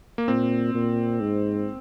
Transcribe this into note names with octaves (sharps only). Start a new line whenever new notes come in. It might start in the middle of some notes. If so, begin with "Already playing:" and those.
A#3
A#2 C4
A#2
G#2